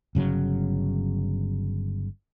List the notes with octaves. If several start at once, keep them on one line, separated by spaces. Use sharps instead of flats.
G1 C#3 F#3